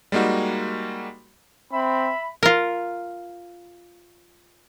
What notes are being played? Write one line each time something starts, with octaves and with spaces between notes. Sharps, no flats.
G3 G#3 A#3 D#4 F#4
C4 E5 B5
F4 A#4